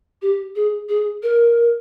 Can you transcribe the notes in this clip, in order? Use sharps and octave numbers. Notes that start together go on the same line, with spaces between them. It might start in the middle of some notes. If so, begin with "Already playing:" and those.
G4
G#4
G#4
A#4